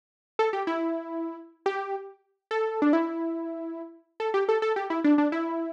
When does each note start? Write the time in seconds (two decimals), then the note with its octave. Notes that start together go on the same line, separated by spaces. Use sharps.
0.39 A4
0.53 G4
0.67 E4
1.66 G4
2.51 A4
2.82 D4
2.93 E4
4.20 A4
4.34 G4
4.49 A4
4.62 A4
4.76 G4
4.90 E4
5.04 D4
5.18 D4
5.32 E4